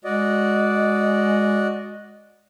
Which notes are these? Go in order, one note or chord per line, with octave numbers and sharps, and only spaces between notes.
G#3 F#4 D5 D#5